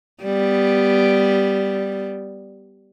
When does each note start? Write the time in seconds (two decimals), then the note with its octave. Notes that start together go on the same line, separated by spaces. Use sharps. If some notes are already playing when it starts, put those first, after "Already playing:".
0.23 G3 B3